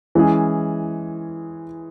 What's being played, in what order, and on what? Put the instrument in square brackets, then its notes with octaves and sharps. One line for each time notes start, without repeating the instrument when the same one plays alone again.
[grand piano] E3 G#3 C#4 G#4